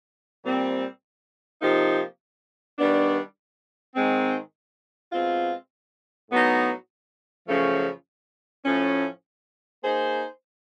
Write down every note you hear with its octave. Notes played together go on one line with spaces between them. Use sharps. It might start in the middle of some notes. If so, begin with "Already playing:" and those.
A#2 G3 C4
C3 F3 A#3 D#4 G4
D#3 G3 B3 D4
G#2 D#3 G#3 C4
B2 G#3 C4 F4
A2 F#3 B3 D#4
F#2 C#3 F3 A3 C#4
A2 F3 A3 C#4
A#3 D#4 G#4 C5